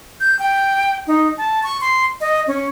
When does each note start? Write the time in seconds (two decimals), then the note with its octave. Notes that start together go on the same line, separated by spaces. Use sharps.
0.20 G6
0.39 G5
1.07 D#4
1.38 A5
1.63 C#6
1.81 C6
2.21 D#5
2.47 C#4